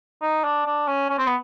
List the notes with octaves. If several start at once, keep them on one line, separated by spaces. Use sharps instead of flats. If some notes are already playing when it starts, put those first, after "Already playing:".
D#4
D4
D4
C#4
C#4
C4
B3